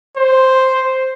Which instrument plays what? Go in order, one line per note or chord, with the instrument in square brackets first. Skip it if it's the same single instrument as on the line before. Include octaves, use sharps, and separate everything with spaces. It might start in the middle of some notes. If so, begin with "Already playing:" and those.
[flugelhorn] C5